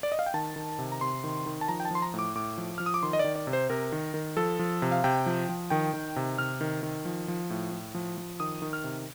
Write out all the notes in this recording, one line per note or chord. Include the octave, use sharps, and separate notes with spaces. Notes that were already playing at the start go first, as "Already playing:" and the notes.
D5
D#5
F5
G5
D#3 A5
D#3
C3
A#5
C3 C6
D#3
D#3
A5
F3 A#5
G5
A5
F3 C6
A#5
A2
D6
A2 D6
F3
F3 F6
D#6
D6
D#3 C6
D#5
D#3 D5
D5
C3
C5
C3 A#4
D#3
D#3
F3 A4
F3
C3
F5
C3 G5
F3
F3
D#3 G5
D#3
C3
C3 F6
D#3
D#3
F3
F3
A2
A2
F3
F3
D#3 D#6
D#3
F6
C3